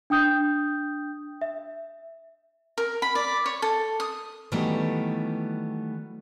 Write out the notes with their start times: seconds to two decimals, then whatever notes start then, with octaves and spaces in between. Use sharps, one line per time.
0.10 D4 G5 D#6 G6
1.41 E5
2.78 A#4
3.02 B5
3.15 D5
3.46 C#5
3.62 A4
4.00 D#6
4.52 D#3 E3 F#3 G3 A3 B3